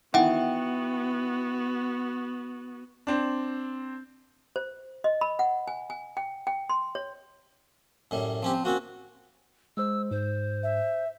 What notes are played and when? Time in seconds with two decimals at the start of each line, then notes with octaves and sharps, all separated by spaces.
0.14 D#3 E3 B3 E4 F#4 E5 F#5 G5
3.07 C4 D4
4.56 C5
5.04 D#5
5.21 B5
5.39 F#5
5.68 G#5
5.90 G#5
6.17 G5
6.47 G5
6.69 C6
6.95 C#5
8.11 F#2 A2 G3
8.42 F3 C4 C#4 G4
8.54 F3
8.65 A#3 C4 C#4 F#4
9.77 G#3 C5 E6
10.11 G#2 C5
10.63 E5